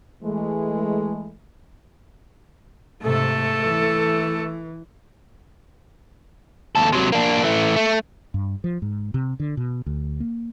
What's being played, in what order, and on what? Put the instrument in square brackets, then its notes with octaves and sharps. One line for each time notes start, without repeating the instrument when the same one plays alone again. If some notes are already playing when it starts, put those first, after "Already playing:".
[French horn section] E3 G#3 A3
[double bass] G#2 C3 [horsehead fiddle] A3 A4
[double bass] E3
[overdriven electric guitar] D#2 A4
C3 F#3
A#3 D4
E3 A3
A3
[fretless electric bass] G2
F3
G#2
C3
D3
B2
D2
A#3